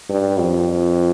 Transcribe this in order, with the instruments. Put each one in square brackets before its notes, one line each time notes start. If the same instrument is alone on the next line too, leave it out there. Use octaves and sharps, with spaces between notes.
[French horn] G2
F2